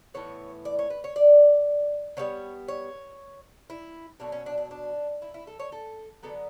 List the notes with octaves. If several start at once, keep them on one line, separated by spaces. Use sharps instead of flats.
A2 E3 B3 C#5
D5
C#5
B4
C#5
D5
D3 G3 B3 C#5
C#5
E4
B2 F#3 A3 D4
C#4
D4
D4
D4
E4
E4
A4
C#5
A4
D3 F#3 B3 A4